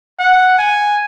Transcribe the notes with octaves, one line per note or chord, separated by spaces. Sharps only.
F#5
G#5